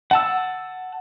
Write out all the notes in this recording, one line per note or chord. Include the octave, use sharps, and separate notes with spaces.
F#5 A5 E6